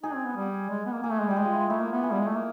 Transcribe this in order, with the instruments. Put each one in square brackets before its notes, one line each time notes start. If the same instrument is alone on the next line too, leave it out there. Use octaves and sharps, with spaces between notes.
[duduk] D#4 [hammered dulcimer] G#4
[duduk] C4
B3
G3
G#3
B3
A#3
[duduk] A#3 [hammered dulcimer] G#4
[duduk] A3
G#3
[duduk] G3 [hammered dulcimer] G4
[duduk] G#3 [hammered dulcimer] G#4
[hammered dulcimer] F4
E4
[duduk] A3 [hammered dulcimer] E4
[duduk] A#3
B3
[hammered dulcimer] G#4
[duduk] G3
G#3
A3
A#3